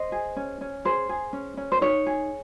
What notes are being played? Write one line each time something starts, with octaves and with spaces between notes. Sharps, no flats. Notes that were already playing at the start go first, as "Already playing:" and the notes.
Already playing: C5 D#5
G#4
C#4
C#4
G#4 C5
G#4
C#4
C#4
C5
D#4 C#5
G#4